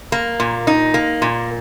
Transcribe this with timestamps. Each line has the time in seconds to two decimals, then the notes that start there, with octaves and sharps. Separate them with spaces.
0.12 A#3
0.40 A#2
0.67 D#4
0.94 A#3
1.22 A#2